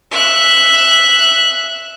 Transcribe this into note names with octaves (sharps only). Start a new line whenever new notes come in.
E5 F#6